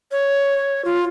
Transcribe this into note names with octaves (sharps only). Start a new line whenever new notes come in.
C#5
F4